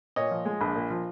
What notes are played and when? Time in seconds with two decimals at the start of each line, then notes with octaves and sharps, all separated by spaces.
0.16 A#2 C#5 D#5
0.31 F3
0.45 G#3
0.61 A#1
0.75 A#2
0.90 F3